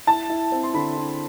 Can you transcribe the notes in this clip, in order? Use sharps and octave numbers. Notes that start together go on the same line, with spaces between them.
E4 A5
E4
C4
C6
D3 B5
E4